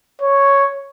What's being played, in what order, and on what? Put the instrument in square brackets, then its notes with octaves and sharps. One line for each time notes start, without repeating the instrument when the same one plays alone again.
[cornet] C#5